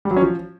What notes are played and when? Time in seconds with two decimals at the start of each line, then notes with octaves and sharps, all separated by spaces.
0.05 G3
0.11 F#3
0.16 C#4
0.22 F3